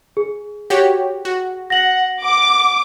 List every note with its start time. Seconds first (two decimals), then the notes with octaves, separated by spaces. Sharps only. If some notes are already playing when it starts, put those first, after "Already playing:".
0.17 G#4
0.70 F#4 G4 C#5
1.25 F#4
1.70 F#5 A#6 F#7
2.24 F#5 D6